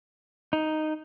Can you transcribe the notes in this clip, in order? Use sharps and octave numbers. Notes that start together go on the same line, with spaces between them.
D#4